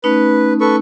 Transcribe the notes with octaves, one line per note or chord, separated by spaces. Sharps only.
A3 C#4 D#4 B4
A4 B4 C#6